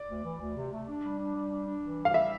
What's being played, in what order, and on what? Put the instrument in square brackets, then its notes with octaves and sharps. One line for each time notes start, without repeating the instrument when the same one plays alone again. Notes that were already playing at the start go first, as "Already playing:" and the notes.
Already playing: [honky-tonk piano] D5
[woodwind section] D2
E3
D2
C3
A3
D4
G3
D4
G3
D4
D4
E3
G3
[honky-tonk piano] F5
E5